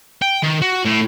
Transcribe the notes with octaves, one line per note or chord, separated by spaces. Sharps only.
G5
D#3
F#4
A2